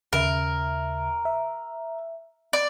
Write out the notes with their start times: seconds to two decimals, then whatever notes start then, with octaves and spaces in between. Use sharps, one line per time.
0.13 D#2 C#3 A#4 E5
1.25 E5
2.53 D5